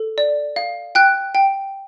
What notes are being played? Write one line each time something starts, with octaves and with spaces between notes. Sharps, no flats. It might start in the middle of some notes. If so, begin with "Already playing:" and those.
Already playing: A4
D5
F5
G5 F#6
G5